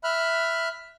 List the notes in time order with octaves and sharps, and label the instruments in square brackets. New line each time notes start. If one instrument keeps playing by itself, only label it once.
[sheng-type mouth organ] E5 B5 F6 F#6